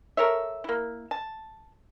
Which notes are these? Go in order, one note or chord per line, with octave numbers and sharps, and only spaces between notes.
A4 A#4 C#5 E5
A#3 E4
A5